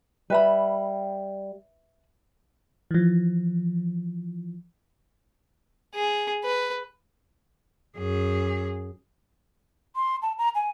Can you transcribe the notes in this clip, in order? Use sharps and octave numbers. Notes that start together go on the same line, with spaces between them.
G3 B4 E5 B5
E3 F3
G#4
B4
F#2 G#4
C6
A5
A#5
G#5